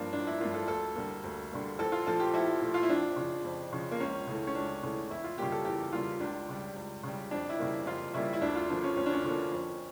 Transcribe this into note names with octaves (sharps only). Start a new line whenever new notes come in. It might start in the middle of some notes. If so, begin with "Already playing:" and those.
Already playing: G2 F3 A#3 D4
A1 D4
E4
G2 F3 A#3 F4
A4
D2 A4
D3 G3 A#3
D2
D3 G3 A#3
A#1 A4
F4
A#2 F3 A3 A4
G4
A#1 E4
A#2 F3 A3
F4
E4
F2 D4
C#3 F3
F2
C#3 F3
A#3
C#2 C#4
C#3 E3 A3
C#4
C#2 D4
C#3 E3 A3
E2 E4
F4
C#3 G3 A#3 G4
A4
E2 G4
C#3 G3 A#3 F4
C#2 D4
C#3 G3
C#2
C#3 G3
F2 D4
E4
C#3 E3 G3 A#3
F2 F4
C#3 E3 G3 A#3 E4
E4
D2 D4
F4
D3 F3 A#3 D4
C#4
D2 C#4
D4
C#4
D3 F3 A#3
F2